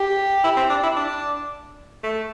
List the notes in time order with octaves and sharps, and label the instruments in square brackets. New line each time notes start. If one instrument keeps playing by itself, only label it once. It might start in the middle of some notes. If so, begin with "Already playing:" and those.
Already playing: [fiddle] G4
[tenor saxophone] E4
C4
D4
E4
D4
A3